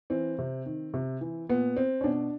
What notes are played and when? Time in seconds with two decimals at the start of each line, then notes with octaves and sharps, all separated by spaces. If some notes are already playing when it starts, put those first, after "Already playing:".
0.10 E3 C4
0.39 C3
0.66 D#3
0.94 C3
1.21 E3
1.49 A#2 B3
1.76 C4
2.01 C#4
2.04 B2 D4